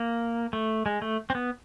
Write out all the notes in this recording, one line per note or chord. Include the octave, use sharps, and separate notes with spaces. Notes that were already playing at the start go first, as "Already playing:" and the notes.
Already playing: A#3
A3
G#3
A3
C4
B3